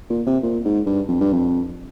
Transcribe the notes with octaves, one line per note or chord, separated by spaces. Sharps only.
A#2
C3
A#2
G#2
G2
F2
G2
F2